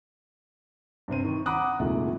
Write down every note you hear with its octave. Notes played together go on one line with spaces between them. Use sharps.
G2 C3 C4 D#7
D#3 C#6
F#5 A#5 B5 D6 D#6 F#6
C2 F2 A#2 D#3 G#3 A3